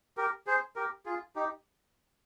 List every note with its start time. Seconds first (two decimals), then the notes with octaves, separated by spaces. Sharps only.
0.17 G4 A#4
0.47 G#4 C5
0.76 G4 A#4
1.06 F4 G#4
1.36 D#4 G4